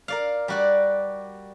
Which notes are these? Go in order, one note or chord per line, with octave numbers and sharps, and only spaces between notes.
A#4 D5 F5
G3 F#4 D5